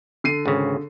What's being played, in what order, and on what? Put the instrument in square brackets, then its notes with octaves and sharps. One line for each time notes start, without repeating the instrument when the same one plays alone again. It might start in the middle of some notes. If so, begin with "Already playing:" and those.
[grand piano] D3 C7 D#7
[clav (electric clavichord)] G#1 C#3